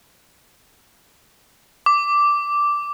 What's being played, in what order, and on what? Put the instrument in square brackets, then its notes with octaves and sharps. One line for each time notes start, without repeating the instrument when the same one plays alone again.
[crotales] D6